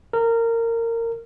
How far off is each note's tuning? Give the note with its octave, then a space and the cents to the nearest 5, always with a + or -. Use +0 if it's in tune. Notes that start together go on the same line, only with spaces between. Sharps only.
A#4 -20